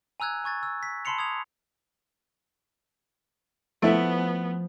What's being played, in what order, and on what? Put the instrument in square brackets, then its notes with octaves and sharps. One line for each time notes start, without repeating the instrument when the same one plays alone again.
[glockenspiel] G#5 A#5 E6 F#6 G#6
G#5 C#6 G#6 A6
E6
B6
A5 B5 C6 C7 C#7 F7
D#6 G#6 F7
[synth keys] F3 [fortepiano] A3 E4 [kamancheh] B3